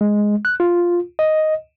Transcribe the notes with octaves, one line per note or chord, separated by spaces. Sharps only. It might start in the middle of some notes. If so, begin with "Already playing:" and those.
G#3
F#6
F4
D#5